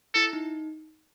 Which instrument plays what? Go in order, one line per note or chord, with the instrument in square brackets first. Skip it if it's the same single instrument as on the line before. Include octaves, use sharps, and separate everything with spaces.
[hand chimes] E4 [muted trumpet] A4
[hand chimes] D#4